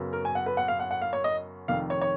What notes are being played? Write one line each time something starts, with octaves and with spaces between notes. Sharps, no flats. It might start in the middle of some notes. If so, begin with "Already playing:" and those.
Already playing: F#2 C#3 F#3 B3
A#4
G#5
F#5
B4
F#5
F5
F#5
F#5
F5
C#5
D#5
F1 F2 D#3 F5
C#5
C#5